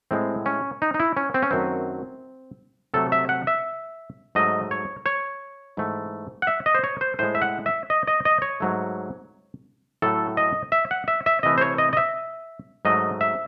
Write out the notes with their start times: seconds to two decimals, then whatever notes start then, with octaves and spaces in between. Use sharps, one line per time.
0.11 A2 G#3 C4
0.46 C#4
0.82 D#4
0.94 D#4
1.00 E4
1.17 C#4
1.34 C4
1.43 C#4
1.51 F#2 D#3 F#3 A3 C4
2.94 C3 F#3 A3 A4
3.12 E5
3.29 F#5
3.47 E5
4.35 G#2 F#3 A3 D#5
4.71 C#5
5.06 C#5
5.77 G#2 E3 A3
6.42 F#5
6.47 E5
6.66 D#5
6.75 C5
6.84 C#5
7.01 C5
7.19 A2 G#3 C5
7.35 E5
7.42 F#5
7.66 E5
7.90 D#5
8.07 D#5
8.25 D#5
8.42 C#5
8.60 G#2 F#3 A3
10.02 A2 F#3 A3 A4
10.37 D#5
10.72 E5
10.91 F#5
11.08 E5
11.26 E5
11.43 C3 E3 A3 D#5
11.58 C5
11.61 C#5
11.78 D#5
11.93 D#5
11.97 E5
12.85 G#2 F#3 A3 D#5
13.21 E5